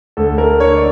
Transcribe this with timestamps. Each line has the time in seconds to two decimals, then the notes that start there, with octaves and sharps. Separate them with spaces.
0.17 D2 A4
0.38 A3 A#4
0.60 D3 C#5
0.76 D5